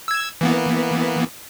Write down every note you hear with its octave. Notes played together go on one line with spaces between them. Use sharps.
E6 G#6
E3 A#3 B3